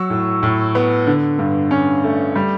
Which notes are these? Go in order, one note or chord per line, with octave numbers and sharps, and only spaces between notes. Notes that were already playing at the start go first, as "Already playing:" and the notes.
Already playing: F#3 C#6 E6
A2
A2
B3
D3
G2
C#4
A3
G3